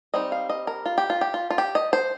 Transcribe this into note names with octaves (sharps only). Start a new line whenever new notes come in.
G3 C4 D#4 D#5
F5
D#5
A#4
F4
G4
F4
G4
F4
F4
G4
D#5
C5